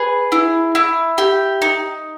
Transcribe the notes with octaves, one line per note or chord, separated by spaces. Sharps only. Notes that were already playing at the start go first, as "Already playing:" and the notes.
Already playing: G#4 B4
E4
E4
G4
D#4